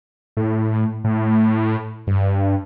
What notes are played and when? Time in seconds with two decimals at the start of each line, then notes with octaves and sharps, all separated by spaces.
0.37 A2
1.04 A2
2.07 G2